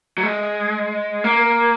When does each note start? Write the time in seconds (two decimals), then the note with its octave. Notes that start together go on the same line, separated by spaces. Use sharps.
0.18 F#3
0.23 G#3
1.24 A#3